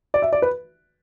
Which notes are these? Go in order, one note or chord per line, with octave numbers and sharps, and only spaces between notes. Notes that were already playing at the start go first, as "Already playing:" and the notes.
D5
E5
D5
B4